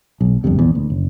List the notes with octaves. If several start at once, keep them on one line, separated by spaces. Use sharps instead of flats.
B1
G1 C2 F2 C3
A#1 E2
D2
F#1